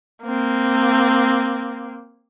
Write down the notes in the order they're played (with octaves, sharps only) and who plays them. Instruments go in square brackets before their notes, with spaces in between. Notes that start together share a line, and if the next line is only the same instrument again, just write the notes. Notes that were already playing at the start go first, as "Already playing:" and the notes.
[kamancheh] A#3 C4